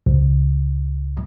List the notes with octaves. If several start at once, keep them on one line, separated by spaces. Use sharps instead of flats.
C#2